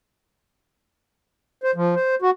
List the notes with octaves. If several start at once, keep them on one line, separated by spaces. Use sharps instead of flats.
C5
F3
C5
F#4